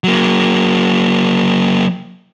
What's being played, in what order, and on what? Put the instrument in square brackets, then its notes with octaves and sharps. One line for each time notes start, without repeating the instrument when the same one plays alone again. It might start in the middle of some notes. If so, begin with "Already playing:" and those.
[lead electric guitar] F#3 A#3